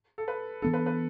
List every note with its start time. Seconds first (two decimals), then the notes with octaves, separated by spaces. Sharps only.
0.18 A4
0.28 B4
0.62 E3 B3 D4 A4
0.74 B4
0.86 B4